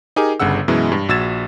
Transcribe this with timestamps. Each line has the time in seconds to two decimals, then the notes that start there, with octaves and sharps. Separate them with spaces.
0.16 D#4 G4 G#4 A#4 G#5 D6
0.40 G1 G2 C#3 F#5 E6
0.68 F#2 B2 E3 G#3 E4
0.92 G2
1.09 A#1 F#4 E6 G#6 A6 E7